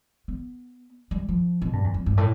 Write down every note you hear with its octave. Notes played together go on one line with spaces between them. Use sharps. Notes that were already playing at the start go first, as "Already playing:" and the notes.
B3
G3
F3
B2
G2
E2
F2
G2
A2